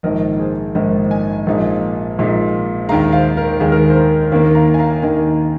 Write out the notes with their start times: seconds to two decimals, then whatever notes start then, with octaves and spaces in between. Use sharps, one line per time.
0.03 A#1 G#2 D#3 A#4 D#5
0.39 G#4 C5
0.75 A#1 G#2 D#3 A#4 D#5
1.11 D#5 G#5
1.46 A#1 A#2 G#3 D#4
2.18 A#1 A#2 G#3 D#4
2.89 D#2 D#3 G#3 F5 A#5
3.13 C5 F5
3.37 A#4
3.60 D#2 D#3 G#3 G#4
3.72 A#4
3.84 G#4
3.90 C5
3.96 A#4
4.32 D#2 D#3 A#3 A#4
4.55 F5 A#5
4.74 G#5
4.79 F5 A#5
5.02 D#2 D#3 A#3 D#5 G#5